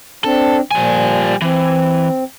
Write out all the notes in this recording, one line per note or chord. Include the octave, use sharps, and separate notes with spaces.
C4 D4 A4
A#2 F3 G3 G#5
E3 C4